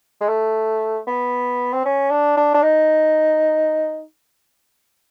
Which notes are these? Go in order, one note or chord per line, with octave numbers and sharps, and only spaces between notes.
G#3
A3
B3
C4
C#4
D4
D4
D4
D#4